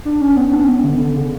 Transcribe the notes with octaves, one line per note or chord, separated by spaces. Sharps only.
D4
C#4
B3
D4
C#4
B3
D3
D3
C#3